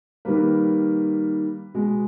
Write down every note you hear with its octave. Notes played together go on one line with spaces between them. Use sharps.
D#3 G3 A#3 B4
B2 G#3